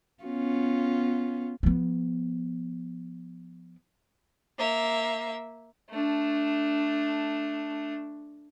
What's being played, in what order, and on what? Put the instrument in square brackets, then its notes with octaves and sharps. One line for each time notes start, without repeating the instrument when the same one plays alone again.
[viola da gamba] B3 C#4 F4
[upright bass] F3 B3
[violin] A#3 E5
[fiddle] A3 D4